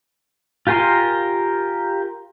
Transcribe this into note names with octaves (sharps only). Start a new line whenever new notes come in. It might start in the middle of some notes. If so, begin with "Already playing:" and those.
F4 G4 A#4 G#5 C6